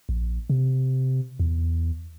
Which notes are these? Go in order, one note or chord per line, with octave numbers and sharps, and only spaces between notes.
A#1
C3
E2